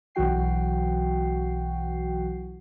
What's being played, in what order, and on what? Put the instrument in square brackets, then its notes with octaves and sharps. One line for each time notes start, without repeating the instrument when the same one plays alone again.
[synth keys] B1 E3 F#3 F#4 G5 C7